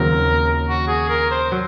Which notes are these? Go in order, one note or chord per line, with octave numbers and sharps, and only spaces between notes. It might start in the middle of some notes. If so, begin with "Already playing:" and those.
Already playing: D#2 C#3 F#3 C4 A#4
F#4
G#4
A#4
C5
F#3